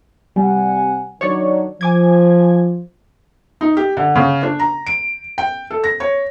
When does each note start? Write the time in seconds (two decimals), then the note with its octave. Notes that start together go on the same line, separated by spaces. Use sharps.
0.36 C3 G3 F#5 G#5
1.21 D#3 F#3 D4 C#5 D5
1.81 F3 G#5 D6 G#6
3.61 D#4
3.77 G4
3.97 D3
4.16 C#3
4.43 D4
4.60 A#5
4.87 D7
5.38 G5
5.71 A4
5.84 A#6
6.00 C#5